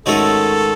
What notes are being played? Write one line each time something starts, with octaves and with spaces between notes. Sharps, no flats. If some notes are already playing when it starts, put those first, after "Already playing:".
G#2 D#3 A3 C#4 F#4 A4